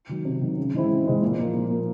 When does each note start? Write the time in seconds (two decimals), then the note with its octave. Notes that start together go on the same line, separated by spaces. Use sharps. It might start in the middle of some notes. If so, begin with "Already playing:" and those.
0.09 D#3 F#3
0.25 C3
0.41 D#3 F#3
0.58 C#3
0.74 E3 G#3 C4 E4
0.90 C#3
1.06 E3 G#3 C4 E4
1.22 A#2
1.38 F3 A#3
1.54 A#2
1.70 F3 A#3